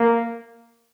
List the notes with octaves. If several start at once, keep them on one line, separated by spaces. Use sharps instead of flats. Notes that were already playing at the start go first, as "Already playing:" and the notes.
Already playing: A#3